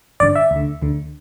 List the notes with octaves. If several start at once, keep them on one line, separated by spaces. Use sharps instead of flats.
A1 G2 D3 D5
E5
D2 D3
D2 D3